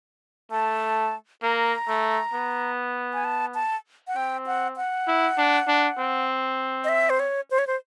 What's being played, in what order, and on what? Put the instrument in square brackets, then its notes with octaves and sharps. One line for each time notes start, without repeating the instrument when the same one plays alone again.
[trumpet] A3 [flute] A5
[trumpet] A#3 [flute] A#5
[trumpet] A3
B3
[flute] G#5
A5
A5
F#5
[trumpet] C4 [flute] G5
[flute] F#5
F#5
[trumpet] E4
D4
D4
C4
[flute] D#5
E5
C5
C#5
C5
C#5
C5